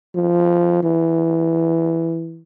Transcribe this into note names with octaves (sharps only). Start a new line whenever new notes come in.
F3
E3